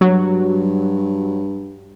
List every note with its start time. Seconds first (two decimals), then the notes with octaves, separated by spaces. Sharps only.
0.01 G2 F#3